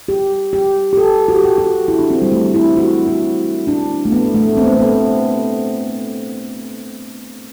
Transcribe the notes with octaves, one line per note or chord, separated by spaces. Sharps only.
G4
G4
G4
A4
F#4
G4
F#4
F#4
E4
D4
C4
G3
A3
E4
F#4
F#4
D4
A3
B3
A3
C4
B3
A3
B3